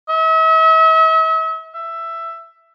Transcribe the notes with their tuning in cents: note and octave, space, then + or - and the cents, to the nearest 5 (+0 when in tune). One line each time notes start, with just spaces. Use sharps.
E5 -40
E5 +10